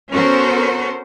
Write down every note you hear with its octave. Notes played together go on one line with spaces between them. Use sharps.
B3 C#4 F#4 A4 A#4 C5